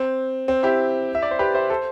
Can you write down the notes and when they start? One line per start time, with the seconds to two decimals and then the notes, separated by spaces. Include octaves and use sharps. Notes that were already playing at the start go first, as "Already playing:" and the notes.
Already playing: C4
0.48 C4
0.63 E4 G4
1.15 E5
1.23 D5
1.31 C5
1.39 G4 B4
1.55 C5 E5
1.70 A4 C5